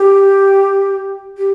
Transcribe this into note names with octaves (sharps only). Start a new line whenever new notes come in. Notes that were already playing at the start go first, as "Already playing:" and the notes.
Already playing: G4
G4